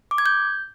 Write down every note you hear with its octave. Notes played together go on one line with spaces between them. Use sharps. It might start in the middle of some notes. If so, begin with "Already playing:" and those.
D6
G#6
G6